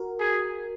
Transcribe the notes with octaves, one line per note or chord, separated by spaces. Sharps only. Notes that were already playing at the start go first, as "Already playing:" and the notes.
Already playing: F#4 A#4
G#4